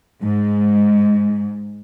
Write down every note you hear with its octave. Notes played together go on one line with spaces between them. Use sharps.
G#2